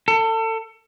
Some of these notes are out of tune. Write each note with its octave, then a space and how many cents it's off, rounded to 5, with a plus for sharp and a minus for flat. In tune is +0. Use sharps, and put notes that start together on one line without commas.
A4 +30